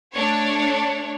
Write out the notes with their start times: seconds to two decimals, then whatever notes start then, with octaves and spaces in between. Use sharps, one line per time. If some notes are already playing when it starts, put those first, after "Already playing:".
0.14 A3 D4 C#5